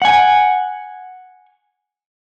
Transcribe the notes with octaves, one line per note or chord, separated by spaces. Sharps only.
F#5 G#5